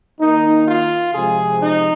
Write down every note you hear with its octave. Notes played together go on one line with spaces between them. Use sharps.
D#3 A#3 D#4
F4
C3 F3 G#3 C4 G#4
D#4